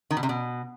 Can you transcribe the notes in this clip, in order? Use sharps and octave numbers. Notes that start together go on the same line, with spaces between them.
D#3
B2
C3
B2